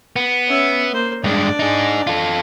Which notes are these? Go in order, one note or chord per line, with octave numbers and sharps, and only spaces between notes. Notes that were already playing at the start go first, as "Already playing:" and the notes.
B3
C#4 E5
A#3 C5
G2 G#3 D4 D5
D#4 G#4
F4 A4